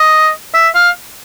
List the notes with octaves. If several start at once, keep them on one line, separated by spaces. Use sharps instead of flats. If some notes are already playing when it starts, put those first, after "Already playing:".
Already playing: D#5
E5
F5